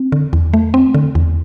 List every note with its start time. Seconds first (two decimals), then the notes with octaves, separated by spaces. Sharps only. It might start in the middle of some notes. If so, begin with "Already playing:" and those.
Already playing: C4
0.12 D3
0.33 E2
0.54 A3
0.74 C4
0.94 D3
1.15 E2